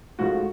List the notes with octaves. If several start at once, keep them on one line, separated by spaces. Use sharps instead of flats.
G#2 F3 A3 F#4